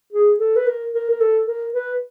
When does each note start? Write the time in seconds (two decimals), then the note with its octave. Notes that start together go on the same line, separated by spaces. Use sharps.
0.13 G#4
0.40 A4
0.56 B4
0.66 A#4
0.93 A#4
1.10 A#4
1.20 A4
1.47 A#4
1.74 B4